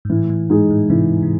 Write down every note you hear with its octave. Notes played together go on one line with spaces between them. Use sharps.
G#2
A2 E3
A2
G#2 G#3 D#4 G#4
A2
G#2 C3 E3
C3